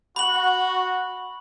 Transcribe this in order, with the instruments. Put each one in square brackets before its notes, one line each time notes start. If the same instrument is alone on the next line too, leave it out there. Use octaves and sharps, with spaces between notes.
[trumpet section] F#4 [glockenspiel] B5 F#7